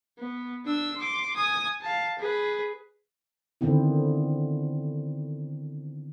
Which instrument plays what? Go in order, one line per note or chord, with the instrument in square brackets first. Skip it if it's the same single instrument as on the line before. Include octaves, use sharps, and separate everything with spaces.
[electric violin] B3
D4 E6
C6 D6
G#5 D#6
F5 A5
G#4 B4
[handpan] D3 D#3 B3 C4 E4